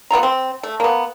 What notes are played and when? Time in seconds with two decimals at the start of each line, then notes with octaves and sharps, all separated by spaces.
0.11 B3 C4 F4 A#5
0.23 C4
0.63 A3
0.80 A#3 B3